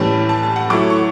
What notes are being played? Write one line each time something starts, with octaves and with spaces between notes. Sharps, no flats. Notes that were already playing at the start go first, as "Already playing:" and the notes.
Already playing: A2 E3 G3 C#4 A5
A5
A5
F#5
F#3 A3 E4 D6
C#6